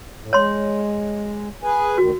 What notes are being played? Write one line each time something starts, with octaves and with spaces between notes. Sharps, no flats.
A2
G#3 C#5 C6
G#4 B4 G#5
D2 D#3 F#4